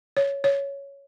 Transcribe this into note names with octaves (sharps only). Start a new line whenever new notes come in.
C#5
C#5